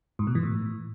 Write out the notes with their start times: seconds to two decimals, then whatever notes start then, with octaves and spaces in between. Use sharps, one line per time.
0.19 G#2
0.27 B2
0.35 E3
0.43 A2